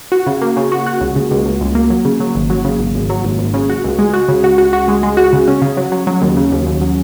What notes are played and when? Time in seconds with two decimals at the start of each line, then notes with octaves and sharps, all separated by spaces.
0.12 F#4
0.27 C#3
0.42 A#3
0.57 C#3
0.72 F#4
0.86 F#4
1.01 C#2
1.16 C#3
1.31 C#2
1.45 C#2
1.61 C#2
1.75 A#3
1.90 F#3
2.05 C#3
2.20 F#3
2.35 G#1
2.50 F#3
2.65 C#3
2.79 G#1
2.95 G#1
3.10 F#3
3.24 G#1
3.39 G#1
3.54 C#3
3.69 F#4
3.84 C#2
3.99 G#3
4.13 F#4
4.28 C#3
4.44 F#4
4.58 F#4
4.73 F#4
4.88 G#3
5.03 G#3
5.17 F#4
5.33 C#3
5.48 C#4
5.62 C#3
5.77 F#3
5.92 F#3
6.07 F#3
6.22 D#2
6.37 C#3
6.52 D#2
6.66 D#2
6.81 F#3